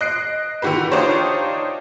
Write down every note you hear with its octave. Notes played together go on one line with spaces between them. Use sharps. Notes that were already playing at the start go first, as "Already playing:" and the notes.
D#5 F#6 C7 D7
D3 E3 F#4 G4 B4
D4 D#4 F4 G4 C5 C#5